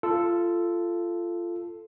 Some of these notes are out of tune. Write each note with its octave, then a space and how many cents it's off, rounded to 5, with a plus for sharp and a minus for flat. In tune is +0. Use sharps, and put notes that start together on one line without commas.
F4 -20 A4 +0